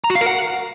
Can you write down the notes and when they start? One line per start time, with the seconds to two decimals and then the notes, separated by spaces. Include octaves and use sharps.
0.04 A#5
0.10 F#4
0.15 F5
0.21 A#4
0.26 F#5